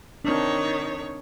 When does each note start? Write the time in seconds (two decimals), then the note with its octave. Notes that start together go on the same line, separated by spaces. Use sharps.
0.25 D#3 C4 D4 C#5